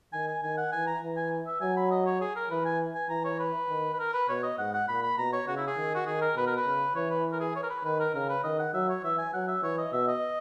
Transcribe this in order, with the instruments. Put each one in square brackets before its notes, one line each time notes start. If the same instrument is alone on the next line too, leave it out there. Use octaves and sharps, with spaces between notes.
[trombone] D#3 [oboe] G#5
[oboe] G#5
[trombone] D#3 [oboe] G#5
[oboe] F#5
[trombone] E3 [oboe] G#5
[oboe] A#5
[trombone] E3
[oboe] G#5
E5
[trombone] F#3 [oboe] G#5
[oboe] B5
D#5
C#5
G#4
A#4
[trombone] E3 [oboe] B4
[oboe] G#5
G#5
[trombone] E3 [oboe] A#5
[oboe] C#5
B4
[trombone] D#3
[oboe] B4
A#4
B4
[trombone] B2 [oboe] C#5
[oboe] D#5
[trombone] G#2 [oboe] F#5
[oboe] F#5
[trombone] A#2 [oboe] B5
[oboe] B5
[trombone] B2 [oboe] A#5
[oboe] C#5
[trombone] C#3 [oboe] F#4
[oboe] E4
G#4
[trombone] D#3
[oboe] F#4
[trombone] D#3 [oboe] G#4
[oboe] A#4
[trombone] B2 [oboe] B4
[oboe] A#4
B4
[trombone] C#3
[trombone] E3 [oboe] C#5
[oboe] B4
A#4
G#4
C#5
A#4
B4
[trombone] D#3 [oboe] B4
[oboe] A#4
[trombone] C#3 [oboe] A#4
[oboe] B4
[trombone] D#3 [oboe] D#5
[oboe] F#5
[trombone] F#3 [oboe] E5
[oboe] C#5
[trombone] E3 [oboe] E5
[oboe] G#5
[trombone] F#3 [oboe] F#5
[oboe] E5
[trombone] E3 [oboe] C#5
[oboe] D#5
[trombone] B2 [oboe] E5
[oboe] D#5